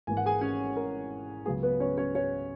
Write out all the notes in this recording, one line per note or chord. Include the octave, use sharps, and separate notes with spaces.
G#1 G#2 E3 A#3 G#5
F#5
G#4 G#5
C#4 C#5
A#4
C#2 C#3 F#3 B3 G#4
B3 B4
C#4 C#5
C#4 C#5
C#4 C#5